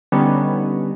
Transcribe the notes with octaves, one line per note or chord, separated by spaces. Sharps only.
D3 G3 B3 C#4 D#4